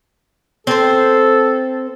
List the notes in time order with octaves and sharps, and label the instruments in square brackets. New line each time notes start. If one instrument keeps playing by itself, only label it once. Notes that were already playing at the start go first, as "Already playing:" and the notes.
[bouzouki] C4 C5 [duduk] A4